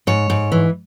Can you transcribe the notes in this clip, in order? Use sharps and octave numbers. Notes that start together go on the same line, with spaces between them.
G#2 C#5
G#2
E3